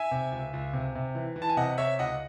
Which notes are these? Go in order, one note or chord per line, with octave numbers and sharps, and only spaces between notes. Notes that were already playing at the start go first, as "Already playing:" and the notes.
Already playing: E5 G#5
C3
C#2
C#2
C3
C3
E3
E3
A5
G#5
C3 D#5 F#5
C3 C#5 E5
C#2 D#5 F#5